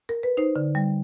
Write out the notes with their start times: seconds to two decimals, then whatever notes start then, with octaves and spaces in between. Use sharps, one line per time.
0.09 A#4
0.23 B4
0.37 D#4 C5
0.56 D3
0.75 G3